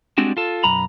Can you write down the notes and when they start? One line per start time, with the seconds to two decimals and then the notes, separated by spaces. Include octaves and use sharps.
0.18 G3 G#3 C4 D4 F#4
0.37 F4 A4
0.64 B1 F#2 A#5 B5